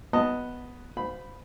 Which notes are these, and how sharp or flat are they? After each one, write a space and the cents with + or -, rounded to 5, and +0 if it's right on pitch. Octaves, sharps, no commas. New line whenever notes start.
B3 +0 D#5 +0 A5 +35
C5 -30 F5 +25 B5 +0